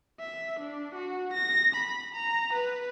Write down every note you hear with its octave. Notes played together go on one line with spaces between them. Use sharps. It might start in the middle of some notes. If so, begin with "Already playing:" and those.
E5
D4
F#4
A#6
B5
A#5
B4